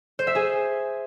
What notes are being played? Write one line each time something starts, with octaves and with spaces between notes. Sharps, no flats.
C5
E5
G#4